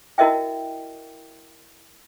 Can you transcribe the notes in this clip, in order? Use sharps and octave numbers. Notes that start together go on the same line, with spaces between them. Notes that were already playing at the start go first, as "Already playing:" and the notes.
E4 F#4 A#4 D#5 E5 G5